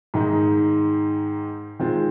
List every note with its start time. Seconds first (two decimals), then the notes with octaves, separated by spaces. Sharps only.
0.14 G#2 D#3 G#3 D#4
1.79 D#3 G#3 C4 F4